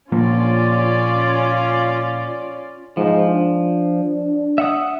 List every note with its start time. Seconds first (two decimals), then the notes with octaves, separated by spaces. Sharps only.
0.12 A#2 F3 A#3 C#4 F4 D5
2.97 G#2 F3
3.29 D4
4.58 E5 F#5 D#6